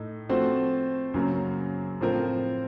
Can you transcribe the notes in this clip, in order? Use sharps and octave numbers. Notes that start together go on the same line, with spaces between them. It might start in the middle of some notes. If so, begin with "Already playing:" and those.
Already playing: A2 A3 D#4
F3 A3 C4 F#4 C5
F#2 C#3 F#3 A#3
A2 F3 C4 F4 A#4